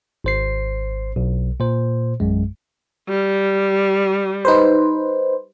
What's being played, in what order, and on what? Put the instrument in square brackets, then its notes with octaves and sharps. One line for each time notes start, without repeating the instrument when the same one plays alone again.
[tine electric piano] G#1 C5 C7
B1
A#2 C5
A#1 F#2 G#3
[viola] G3
[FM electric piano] D#4 B4 C5